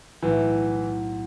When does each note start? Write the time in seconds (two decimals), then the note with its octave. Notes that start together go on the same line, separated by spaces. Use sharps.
0.22 B1 A2 E3 A3